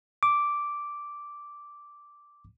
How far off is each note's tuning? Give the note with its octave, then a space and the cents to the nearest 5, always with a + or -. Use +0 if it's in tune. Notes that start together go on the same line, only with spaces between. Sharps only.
D6 -5